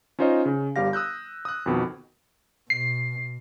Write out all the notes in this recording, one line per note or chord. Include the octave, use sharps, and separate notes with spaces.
C#4 D#4 F4 C5 C#5 D#5
C#3
G1 G3 G4 F5 A#6
D#6 E6 F#6 G6
D#6 F#6
F2 B2 D#3
B2 C7